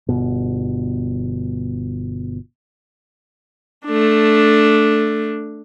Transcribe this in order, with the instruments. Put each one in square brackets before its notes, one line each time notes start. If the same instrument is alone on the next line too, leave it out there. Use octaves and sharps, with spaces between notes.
[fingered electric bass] G1 B2
[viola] A3 D4